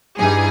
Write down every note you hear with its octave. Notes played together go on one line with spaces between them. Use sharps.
G2 E3 G3 D#4 G#4 G#5